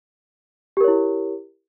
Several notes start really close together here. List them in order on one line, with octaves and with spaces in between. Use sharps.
G4 A#4 C#5 E4